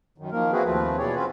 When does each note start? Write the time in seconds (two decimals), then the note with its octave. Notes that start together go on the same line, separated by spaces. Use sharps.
0.18 F#2 D#3
0.32 D#3 F3 A#3 A#4
0.52 A#3 C4 E4 F#4 G#4 B4
0.64 D#2 F3 A3 C4 B4
0.98 B2 E3 G#4 C#5 D5
1.15 C4 C#4 F4 F#4 B4